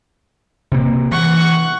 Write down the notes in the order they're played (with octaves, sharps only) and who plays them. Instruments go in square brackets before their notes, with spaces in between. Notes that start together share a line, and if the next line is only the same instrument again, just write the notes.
[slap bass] C3 A#3
[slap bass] E3 [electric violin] F#5 C#6